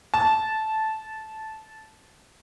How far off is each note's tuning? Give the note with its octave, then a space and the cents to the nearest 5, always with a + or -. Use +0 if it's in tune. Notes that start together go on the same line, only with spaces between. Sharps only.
A5 -10